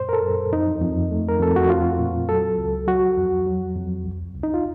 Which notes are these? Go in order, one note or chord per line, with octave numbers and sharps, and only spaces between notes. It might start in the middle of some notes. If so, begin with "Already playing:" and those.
Already playing: F#2 A#2 C5
A#4
A4
F#2
F2 D#4
F2
A3
A#4
F2 A4
F#4
C4 F4
A#2
F#3 A4
C#2
F#3 F#4
F2
F#3
F2
C2
C2
D#4
F4